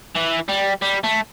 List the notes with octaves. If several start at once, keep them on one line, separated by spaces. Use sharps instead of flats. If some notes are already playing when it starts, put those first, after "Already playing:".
E3
G3
G3
A3